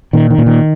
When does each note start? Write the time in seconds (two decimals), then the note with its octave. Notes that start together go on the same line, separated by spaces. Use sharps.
0.13 A#2 D#3
0.31 D#3
0.38 A#2
0.46 D#3